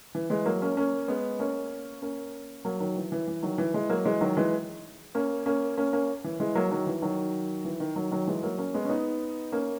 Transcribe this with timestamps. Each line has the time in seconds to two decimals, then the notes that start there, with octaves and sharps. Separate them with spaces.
0.15 E3
0.30 E3 G#3
0.46 F#3 A#3
0.62 A#3 C#4
0.77 A#3 C#4
1.08 G#3 B3
1.39 A#3 C#4
2.02 A#3 C#4
2.65 F#3 A#3
2.80 D#3 F#3
2.96 E3
3.12 E3
3.28 E3
3.43 D#3 F#3
3.58 E3
3.74 E3 G#3
3.90 F#3 A#3
4.05 E3 G#3
4.21 D#3 F#3
4.37 E3 G#3
5.15 A#3 C#4
5.46 A#3 C#4
5.77 A#3 C#4
5.93 A#3 C#4
6.24 E3
6.40 E3 G#3
6.55 F#3 A#3
6.71 D#3 F#3
6.87 E3
7.02 D#3 F#3
7.65 E3
7.80 D#3
7.96 D#3 F#3
8.11 D#3 F#3
8.27 E3 G#3
8.43 F#3 A#3
8.59 A#3 C#4
8.74 G#3 B3
8.85 C#4
8.90 B3 D#4
9.52 A#3 C#4